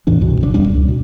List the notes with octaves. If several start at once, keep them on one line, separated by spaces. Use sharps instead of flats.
E2 A2 E3 D4
C2 G2 B2
F#1 C#3 D4
D1 F2 G3 D4
C#2
B2